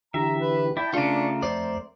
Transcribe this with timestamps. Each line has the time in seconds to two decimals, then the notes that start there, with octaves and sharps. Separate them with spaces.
0.14 D3 E3 G4 E5 A#5
0.40 B4
0.77 E4 D5 G5 A5
0.94 C#3 A3 D4 F4 A#4 D5 C#6
1.42 F2 C4 C5 D5